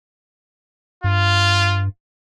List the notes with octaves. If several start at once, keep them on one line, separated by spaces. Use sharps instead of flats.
G2 F4